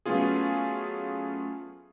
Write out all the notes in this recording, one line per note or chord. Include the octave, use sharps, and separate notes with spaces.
F#3 A3 B3 C#4 F4 G#4